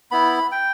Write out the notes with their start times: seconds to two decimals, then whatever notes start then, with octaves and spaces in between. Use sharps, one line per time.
0.11 B3 E4 B5
0.52 G5